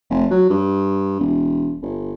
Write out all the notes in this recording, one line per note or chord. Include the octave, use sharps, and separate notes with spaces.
F1
F#3
G2
E1
G1